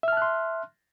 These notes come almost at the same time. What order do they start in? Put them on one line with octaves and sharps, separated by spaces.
E5 F6 A5 F#6 C6